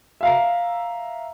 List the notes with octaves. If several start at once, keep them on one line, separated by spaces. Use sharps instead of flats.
E5 F5 A#5